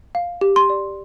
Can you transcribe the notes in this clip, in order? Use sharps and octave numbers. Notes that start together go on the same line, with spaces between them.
F5
G4
C6
D5